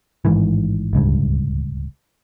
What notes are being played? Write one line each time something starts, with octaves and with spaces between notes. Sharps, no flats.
A1 G#2 D#3 E3
D1 C#2 G2